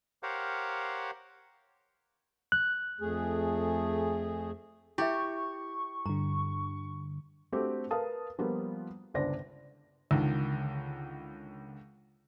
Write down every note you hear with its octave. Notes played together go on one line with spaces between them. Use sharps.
G4 A#4 C5 C#5 F5 F#5
F#6
F2 A3 G#4
E4 G4 E5 C#6
G2 D3 A#5
A3 C4 D4 F#4 G4
A#4 B4 F5 A5 D#6
F3 G3 A#3 B3 F4
G1 C#2 D4 C5 D5 A#6
C#2 D3 D#3